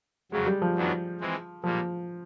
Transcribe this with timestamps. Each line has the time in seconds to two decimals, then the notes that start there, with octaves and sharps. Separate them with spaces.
0.32 F2 C#3 F#3 G#3
0.47 G3
0.62 F3
0.76 F#2 D#3 F#3 B3 D4
1.21 E3 G#3 C4
1.64 A#2 F3 G3 A#3